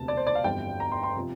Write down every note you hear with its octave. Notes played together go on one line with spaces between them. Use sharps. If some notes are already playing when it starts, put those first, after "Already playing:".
Already playing: E1 D2 C3 A5
D5
C5
D5
F5
G1 F2 E3 G3 G5
A#5
C6
C6
C3 F3